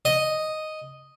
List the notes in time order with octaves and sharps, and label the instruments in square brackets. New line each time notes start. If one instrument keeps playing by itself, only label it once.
[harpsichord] D#5